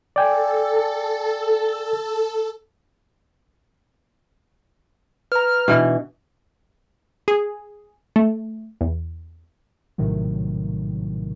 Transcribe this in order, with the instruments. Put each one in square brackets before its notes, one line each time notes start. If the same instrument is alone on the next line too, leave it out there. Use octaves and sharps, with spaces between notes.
[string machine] A4 [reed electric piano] D5 G5 G#5
[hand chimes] B4 A#5 [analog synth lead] F6
[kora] B2 E3 [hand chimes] D4
[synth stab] G#4
A3
E2
[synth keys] A#1 A2 C3 D#3 F#3